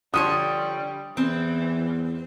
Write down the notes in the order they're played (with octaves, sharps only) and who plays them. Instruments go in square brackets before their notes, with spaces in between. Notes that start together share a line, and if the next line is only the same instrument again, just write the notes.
[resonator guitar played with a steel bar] D3 F3 C#5 [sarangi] G3 [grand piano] D#6
[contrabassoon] E2 [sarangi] E3 [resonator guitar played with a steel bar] C4